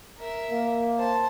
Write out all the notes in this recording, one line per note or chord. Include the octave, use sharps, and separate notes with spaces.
A#4 E5
A#3
C5 A5